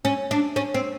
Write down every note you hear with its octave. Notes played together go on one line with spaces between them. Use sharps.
C#4
D4
C#4
C4